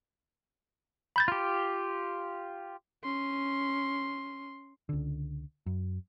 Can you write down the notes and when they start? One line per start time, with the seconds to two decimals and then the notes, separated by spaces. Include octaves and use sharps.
1.16 B5 G6 A6
1.28 F4 G4
3.03 C#4 C6
4.89 C#2 D3
5.66 F#2